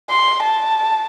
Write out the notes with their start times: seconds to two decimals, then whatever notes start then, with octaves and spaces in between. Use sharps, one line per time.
0.10 C6
0.43 A5